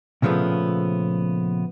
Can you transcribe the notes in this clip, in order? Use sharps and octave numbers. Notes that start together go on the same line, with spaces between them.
A#2 C#3 F3 A3 B3